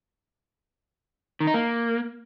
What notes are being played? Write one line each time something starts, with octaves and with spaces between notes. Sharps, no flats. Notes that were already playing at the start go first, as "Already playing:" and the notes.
D#3
D#4
A#3